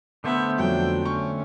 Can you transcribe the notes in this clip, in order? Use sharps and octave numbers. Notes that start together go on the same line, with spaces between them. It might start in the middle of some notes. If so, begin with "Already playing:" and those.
D3 A3 B3 C5 E5
F2 F#3 D4 G5
C#4 C#6